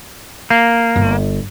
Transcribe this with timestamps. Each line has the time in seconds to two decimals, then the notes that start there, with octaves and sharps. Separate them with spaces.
0.50 A#3
0.96 G1